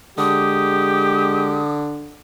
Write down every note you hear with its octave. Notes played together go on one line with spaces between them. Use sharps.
D3 G#3 G4 D#6